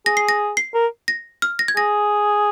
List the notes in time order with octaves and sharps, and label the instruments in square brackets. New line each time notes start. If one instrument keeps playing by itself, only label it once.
[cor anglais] G#4 [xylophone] A#6
[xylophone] C7
A#6
C7
[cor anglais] A#4
[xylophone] A#6
F6
A#6
G#6
[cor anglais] G#4 [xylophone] A#6